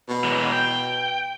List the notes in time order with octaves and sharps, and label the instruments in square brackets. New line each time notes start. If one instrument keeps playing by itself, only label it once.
[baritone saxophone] B2
[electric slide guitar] E3 F#3 G#3
G5